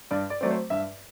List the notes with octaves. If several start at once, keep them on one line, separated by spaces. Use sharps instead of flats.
G2 D5
D5
F#3 A3 C4 D5
C5
G2 E5